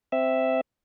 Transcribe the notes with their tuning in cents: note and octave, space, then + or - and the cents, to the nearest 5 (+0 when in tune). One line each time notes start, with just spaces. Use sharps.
C4 -5 E5 +0